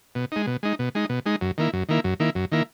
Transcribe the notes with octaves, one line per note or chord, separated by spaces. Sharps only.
B2
G#3 D#4
B2
G#3 D#4
B2
G#3 D#4
B2
G#3 D#4
F#2
D#3 A#3 E4
F#2
D#3 A#3 E4
F#2
D#3 A#3 E4
F#2
D#3 A#3 E4